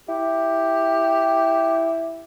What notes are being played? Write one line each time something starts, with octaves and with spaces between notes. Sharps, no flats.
E4 G4